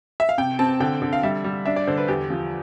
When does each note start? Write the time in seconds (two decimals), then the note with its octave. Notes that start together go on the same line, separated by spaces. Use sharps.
0.20 E5
0.29 F5
0.38 C3 G5
0.59 C4 A5
0.80 D3 G5
1.02 D3
1.13 F5
1.23 G3 E5
1.44 G3
1.66 D4 E5
1.76 D5
1.87 D3 C5
1.98 B4
2.08 E2 G4
2.30 F3